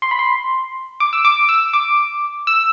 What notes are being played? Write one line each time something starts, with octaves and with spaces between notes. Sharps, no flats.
C6
B5
C6
D6
E6
D6
E6
D6
E6